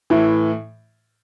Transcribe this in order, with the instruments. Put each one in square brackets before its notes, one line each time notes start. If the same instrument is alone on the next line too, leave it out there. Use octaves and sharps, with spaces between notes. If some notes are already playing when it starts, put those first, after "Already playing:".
[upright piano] A2 E3